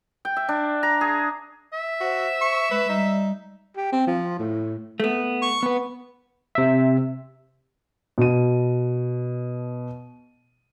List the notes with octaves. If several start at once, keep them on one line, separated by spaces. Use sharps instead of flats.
G5
E5
D4
A#5
G#4
E5
F#4 C5
C#6
G#3 B4
G3 D#4
G4
C4
F3
A2
A3 B3
C#6
B3 B4
C3 E5
B2 D#7